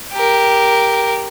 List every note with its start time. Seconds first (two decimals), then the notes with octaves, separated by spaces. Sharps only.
0.13 G4 A#4